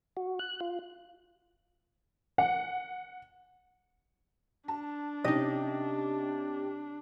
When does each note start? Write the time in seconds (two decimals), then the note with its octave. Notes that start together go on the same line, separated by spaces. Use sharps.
0.17 F#4
0.39 F#6
0.60 F4
2.38 F#5
4.68 D4 A5
5.24 C3 C#4 D#4 G4 D#5